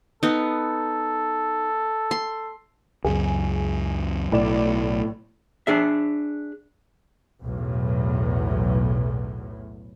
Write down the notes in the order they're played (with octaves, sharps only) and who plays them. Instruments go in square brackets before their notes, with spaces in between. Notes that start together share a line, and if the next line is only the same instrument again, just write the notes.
[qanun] B3 D#4 [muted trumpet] A4
[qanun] C6
[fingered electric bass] C#2 F#2 [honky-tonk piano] G#4
[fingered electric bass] B1 [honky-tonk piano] A2 D5 E7
[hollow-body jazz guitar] D4 G#4 E5
[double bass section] B1 E2 A2